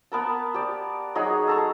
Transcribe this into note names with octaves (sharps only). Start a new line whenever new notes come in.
B3 A#4 A5
G4 D5
F#3 D#4 F#4 G#4
A4 A#5 C#6